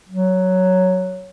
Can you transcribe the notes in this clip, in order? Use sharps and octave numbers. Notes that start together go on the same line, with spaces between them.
F#3